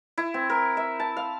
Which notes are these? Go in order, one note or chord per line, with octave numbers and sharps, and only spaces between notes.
E4
C4
A#4
E5
A5
F5